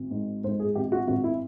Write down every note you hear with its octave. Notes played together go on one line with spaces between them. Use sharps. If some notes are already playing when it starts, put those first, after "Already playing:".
Already playing: G#1
G#2
G#2 C5
G#4
G#1 G4
F#4
G#1 F#4
E4